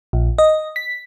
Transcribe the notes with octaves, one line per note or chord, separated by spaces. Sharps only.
A#1
D#5
B6